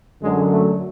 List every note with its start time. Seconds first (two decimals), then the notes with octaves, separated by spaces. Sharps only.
0.21 F#2 D3 F#3 G#3
0.51 A3